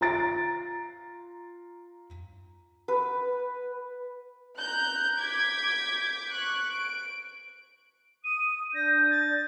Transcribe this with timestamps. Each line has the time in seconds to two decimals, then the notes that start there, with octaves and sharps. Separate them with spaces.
0.01 F4 A#5 A6 D7
2.88 B4
4.57 A#5 F#6 G6
5.17 D6 G6 G#6 B6
6.31 C#6 F#6
6.71 D7
8.24 D#6 D#7
8.74 D4 D5 G6 A#6
9.10 A6